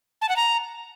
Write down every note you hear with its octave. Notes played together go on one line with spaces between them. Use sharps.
A5
F#5
A#5